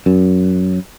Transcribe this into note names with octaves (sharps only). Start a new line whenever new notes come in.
F#2